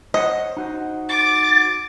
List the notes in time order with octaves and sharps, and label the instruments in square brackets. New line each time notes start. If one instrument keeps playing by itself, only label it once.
[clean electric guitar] C5 C#5 F#5 [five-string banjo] D#5
[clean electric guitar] D#4 F#4 C5
[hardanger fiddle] D6 [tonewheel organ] A6